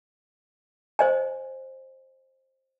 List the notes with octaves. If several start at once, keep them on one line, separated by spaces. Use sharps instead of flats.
C5 D#5 G#5